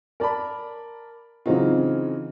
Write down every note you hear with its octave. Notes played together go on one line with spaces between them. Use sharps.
A#4 D5 A5 B5
C#3 E3 F#3 C4 D#4 F4